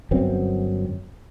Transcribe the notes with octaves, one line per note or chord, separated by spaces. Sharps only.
G1 F#2 B3 C4